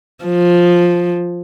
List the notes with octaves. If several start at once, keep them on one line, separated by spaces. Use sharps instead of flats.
F3